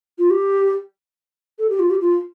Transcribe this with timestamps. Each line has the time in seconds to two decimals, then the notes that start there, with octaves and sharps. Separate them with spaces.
0.19 F4
0.30 G4
1.59 A4
1.69 G4
1.79 F4
1.90 G4
2.01 F4